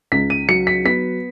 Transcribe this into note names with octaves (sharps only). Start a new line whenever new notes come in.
C#2 B6
D#7
F#3 C#7
B6
B3 B6